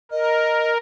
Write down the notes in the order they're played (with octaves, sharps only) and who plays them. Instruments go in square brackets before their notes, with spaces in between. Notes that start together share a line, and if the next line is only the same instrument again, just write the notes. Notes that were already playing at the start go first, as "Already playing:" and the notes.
[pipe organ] A#4 [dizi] D#5